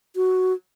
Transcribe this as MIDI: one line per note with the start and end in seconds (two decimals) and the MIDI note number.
0.16 0.53 66